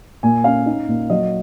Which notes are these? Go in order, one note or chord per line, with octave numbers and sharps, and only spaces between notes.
A#2 G#5
C#4 F5
D#4
A#2
F#3 D#5